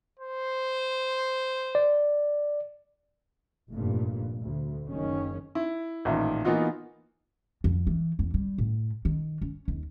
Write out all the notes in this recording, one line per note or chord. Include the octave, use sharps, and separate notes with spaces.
C5
D5
F1 G2 A#2
D2
F#1 D#3 C#4
E4
A1 A#2 D#3 E5
E3 A#3 B3 D#4 F4 F#4
F2
E3
E2
G3
A2
D#3
C#4
D#2